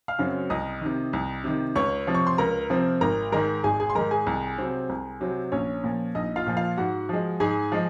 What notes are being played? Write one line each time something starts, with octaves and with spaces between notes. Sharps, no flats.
F5 F6
F#2 C#3 F#3 C4
C2 D#5 D#6
C3 D#3
C2
C3 D#3
C#2 C#5 C#6
C3 F3 C4
C#6
C6
C#2 A#4 A#5
C3 F3 C4
G#1 A#4 A#5
G#2 D#3 G#3 A#4 A#5
G#1 G#4 G#5
G#4 G#5
C6
G#2 D#3 G#3 A#4 A#5
G#4 G#5
C2
C3 F#3 C4
C2
C3 F#3 C4
A#1 C#4 C#5
A#2 F3
A#1 D#4 D#5
F4 F5
A#2 F3
F4 F5
G#2 F#4 F#5
F3 G#3
G#2 G#4 G#5
F3 G#3